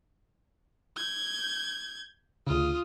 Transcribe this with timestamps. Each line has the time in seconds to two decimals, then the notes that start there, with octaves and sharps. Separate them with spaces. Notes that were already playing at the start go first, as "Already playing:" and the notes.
0.97 G6 G#6
2.47 D2 C#3 F4 D#6